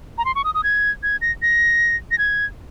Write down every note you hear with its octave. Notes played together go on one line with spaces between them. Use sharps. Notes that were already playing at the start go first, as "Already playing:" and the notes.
A#5
C6
C#6
D#6
D#6
G#6
G#6
A#6
A#6
A#6
G#6